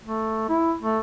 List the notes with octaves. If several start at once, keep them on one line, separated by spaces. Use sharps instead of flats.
A3
E4
A3